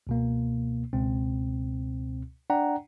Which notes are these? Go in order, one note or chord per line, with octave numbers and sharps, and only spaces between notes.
C#2 B2 A#3
C#2 B2 C4
D4 D5 F#5 G5 A#5